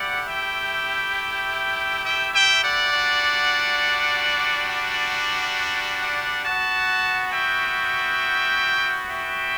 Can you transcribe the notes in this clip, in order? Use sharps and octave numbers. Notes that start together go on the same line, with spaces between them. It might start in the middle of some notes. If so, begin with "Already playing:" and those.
Already playing: A3 E4 G4 D5 F#5
E5 G5
E5 G5
E5 G5
D5 F#5
G3 D4 F#4
D5 F#5
D5 F#5
B3 F#4 F#5 A5
E5 G5
E5 G5